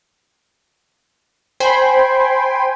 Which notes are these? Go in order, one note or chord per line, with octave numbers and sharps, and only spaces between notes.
C5 G5 G#5 B5 C6